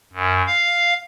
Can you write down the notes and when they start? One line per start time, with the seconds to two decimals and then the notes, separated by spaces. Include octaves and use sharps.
0.13 F#2
0.46 F5